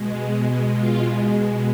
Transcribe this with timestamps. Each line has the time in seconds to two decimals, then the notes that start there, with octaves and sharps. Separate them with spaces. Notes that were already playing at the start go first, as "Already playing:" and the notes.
Already playing: B2 G#3
0.74 F4